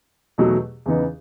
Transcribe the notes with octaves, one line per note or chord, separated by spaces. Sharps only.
E2 B2 F#3 A3 D#4
E2 C#3 E3 B3 D#4